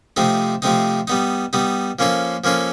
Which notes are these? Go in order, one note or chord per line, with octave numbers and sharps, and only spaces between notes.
C3 F3 A3 C4 D#4
C3 F3 A3 C4 D#4
G3 B3 D#4
G3 B3 D#4
F3 A#3 C#4 F4 A4
F3 A#3 C#4 F4 A4